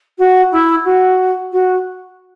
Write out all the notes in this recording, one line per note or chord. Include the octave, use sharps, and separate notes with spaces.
F#4
E4
F#4
F#4